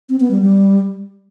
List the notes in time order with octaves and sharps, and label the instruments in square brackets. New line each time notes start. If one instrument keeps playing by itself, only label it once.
[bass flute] C4
B3
G3
G3